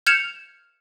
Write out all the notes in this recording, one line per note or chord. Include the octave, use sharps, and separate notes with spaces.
F6 G6 G#6 C#7 E7 F7